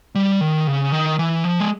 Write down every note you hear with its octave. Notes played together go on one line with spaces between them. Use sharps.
G3
D#3
C#3
D#3
E3
F3
G#3